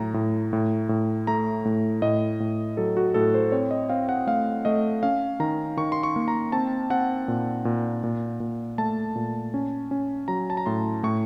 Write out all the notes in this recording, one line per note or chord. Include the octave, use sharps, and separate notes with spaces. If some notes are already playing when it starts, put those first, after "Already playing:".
Already playing: A2 F#3 A#5
A2
A2
A2
A3 A#5
A2
A2 D#5
A2
F#3 A4
F#4
A2 A4
C5
C4 C#5
D#5
C4 F5
F#5
A3 F5
A3 D#5
C#4 F5
D#3 A#5
D#3 C#6
C6
C#6
A#3
A#5
C4 A5
C4 F#5
A#2
A#2
A#2
A#2
A3 A5
A#2
C#4
C#4
F#3 A#5
A5
A#5
A2 C6
A2 C#6